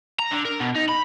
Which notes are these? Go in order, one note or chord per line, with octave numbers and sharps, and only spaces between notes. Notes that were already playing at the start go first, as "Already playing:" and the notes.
A#5
D3
A#4
B2
D#4
B5